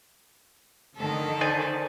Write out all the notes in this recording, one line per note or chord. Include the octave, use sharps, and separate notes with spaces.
D3 D#3 A4
C5 D5 G#5